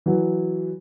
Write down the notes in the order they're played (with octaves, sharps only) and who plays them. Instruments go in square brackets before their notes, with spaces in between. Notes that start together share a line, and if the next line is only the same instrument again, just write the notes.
[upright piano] E3 F#3